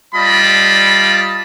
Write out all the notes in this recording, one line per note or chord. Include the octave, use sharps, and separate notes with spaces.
G3 F4 D5 D#5 A5 B5